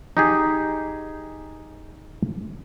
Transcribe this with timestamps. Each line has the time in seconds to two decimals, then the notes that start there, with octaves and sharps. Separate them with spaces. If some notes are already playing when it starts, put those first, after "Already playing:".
0.17 D#4 G4 G#4